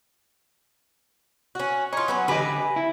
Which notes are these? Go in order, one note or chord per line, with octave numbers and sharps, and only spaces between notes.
C#4 F#4
D#4 F4 C#5
F#3 B3 C#4
D3 G4 B4 D#5 G#5
E4